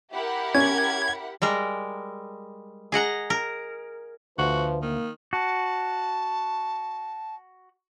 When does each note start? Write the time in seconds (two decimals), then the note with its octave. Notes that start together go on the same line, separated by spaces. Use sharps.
0.13 E4 G4 A#4 F#5 B5
0.55 C#4 G#6
1.42 G3 G#3 A#4
2.92 G#4 D#5 F#5 A#5
3.30 A#4
4.38 D2 F3 F#4 B4
4.82 D#3 A#3
5.33 F#4 A5